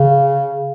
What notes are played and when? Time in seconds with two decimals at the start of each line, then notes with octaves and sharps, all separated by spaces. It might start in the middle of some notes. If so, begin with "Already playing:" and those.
Already playing: C#3